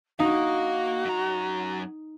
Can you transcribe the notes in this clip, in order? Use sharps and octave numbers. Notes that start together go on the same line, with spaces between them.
A#3 D#4 F#4 F5
F#2 A#5